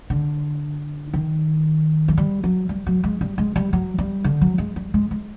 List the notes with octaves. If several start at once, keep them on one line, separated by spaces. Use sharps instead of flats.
D3
D#3
F#3
G3
F#3
G3
F#3
G#3
G3
G#3
G3
F#3
G3
D3
F#3
G#3
G3
G#3
G#3